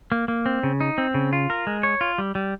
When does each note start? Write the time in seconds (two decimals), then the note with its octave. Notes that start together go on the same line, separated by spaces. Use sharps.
0.12 A#3
0.28 A#3
0.46 C4
0.63 C#3
0.81 D#4
0.98 C4
1.14 C#3
1.33 F4
1.50 A#4
1.67 G#3
1.83 C#5
2.01 F4
2.18 G3
2.35 G3